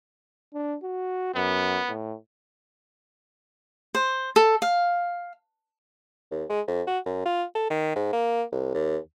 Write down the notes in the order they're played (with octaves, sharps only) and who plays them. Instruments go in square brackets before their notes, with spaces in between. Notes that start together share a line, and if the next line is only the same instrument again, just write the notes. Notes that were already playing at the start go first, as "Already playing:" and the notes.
[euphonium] D4
F#4
[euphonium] F#2 [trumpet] B3
[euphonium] A2
[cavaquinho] C5
A4
F5
[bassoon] D#2
G#3
F2
F#4
F#2
F4
A4
D#3
G#2
A#3
C2
D#2